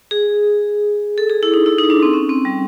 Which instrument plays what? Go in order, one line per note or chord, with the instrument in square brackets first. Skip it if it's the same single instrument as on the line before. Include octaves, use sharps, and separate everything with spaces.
[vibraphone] G#4
A4
G#4
E4
D#4
E4
D#4
D4
C4
C#4
C4
G3